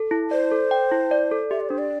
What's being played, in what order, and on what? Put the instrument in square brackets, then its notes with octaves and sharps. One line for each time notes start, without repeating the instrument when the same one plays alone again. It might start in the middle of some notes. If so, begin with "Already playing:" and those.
Already playing: [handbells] A4
E4
[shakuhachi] C5 [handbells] D5
[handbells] A4
G5
E4
D5
A4
[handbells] G4 [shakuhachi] E5
[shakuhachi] D5
[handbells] D4 [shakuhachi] C5
[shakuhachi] D5